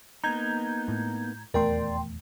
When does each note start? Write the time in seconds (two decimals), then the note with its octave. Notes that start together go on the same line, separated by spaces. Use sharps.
0.24 A#3 B3 D#4 A#5 G6 G#6
0.88 A2
1.54 D#1 E2 A3 A#4 D5 G5 C6